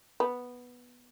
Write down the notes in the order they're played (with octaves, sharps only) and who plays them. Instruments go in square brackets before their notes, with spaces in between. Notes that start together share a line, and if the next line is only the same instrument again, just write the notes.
[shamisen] B3